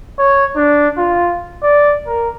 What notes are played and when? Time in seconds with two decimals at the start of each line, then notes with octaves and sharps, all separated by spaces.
0.19 C#5
0.56 D4
0.98 F4
1.63 D5
2.07 A#4